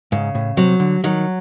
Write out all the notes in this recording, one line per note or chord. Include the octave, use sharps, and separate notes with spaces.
G#2 C#3
A2
C3 F#3
D3
D#3 F#3